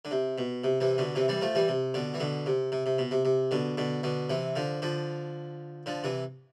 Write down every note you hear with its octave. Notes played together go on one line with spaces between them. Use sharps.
D3
C3
B2
C3
C3 E3
B2 D3
C3 E3
E3 G3
F3 A3
E3 G3
C3
B2 D3
E3
B2 D3
C3
C3
C3
B2
C3
C3
B2 D3
B2 D3
B2 D3
C3 E3
D3 F3
D3 F3
D3 F3
C3 E3